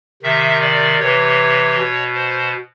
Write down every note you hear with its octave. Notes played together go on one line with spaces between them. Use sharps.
C3 D#3 E5
D5
C3 E3 C#5
B2
C5